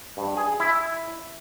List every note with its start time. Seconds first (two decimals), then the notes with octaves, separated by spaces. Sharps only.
0.17 G2
0.37 G#4
0.60 E4